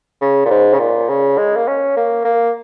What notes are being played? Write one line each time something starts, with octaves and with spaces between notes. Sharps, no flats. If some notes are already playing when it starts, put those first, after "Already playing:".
C#3
A#2
G#2
C#3
A#2
C#3
G#3
A#3
C#4
A#3
A#3